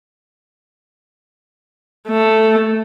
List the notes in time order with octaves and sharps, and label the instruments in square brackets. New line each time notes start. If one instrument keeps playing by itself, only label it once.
[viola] A3